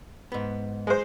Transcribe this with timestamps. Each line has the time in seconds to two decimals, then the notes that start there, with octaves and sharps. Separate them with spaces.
0.32 G#2 B3
0.87 G#3 C5